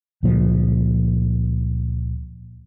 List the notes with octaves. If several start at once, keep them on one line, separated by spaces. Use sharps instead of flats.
C#2 A#2 F3